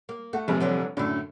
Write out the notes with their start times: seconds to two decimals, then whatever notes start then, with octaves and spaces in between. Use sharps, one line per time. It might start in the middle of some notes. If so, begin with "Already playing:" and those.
0.09 A#3
0.33 A3 F#4
0.48 F1 A#1 C3 G#3
0.60 D3 F#3 B4
0.97 F#2 A2 D3 A3 D4